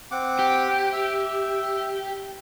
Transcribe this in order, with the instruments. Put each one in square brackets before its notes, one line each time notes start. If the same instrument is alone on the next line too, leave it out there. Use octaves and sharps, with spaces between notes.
[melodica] C4 F#5 D6
[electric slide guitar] G4
[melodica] E5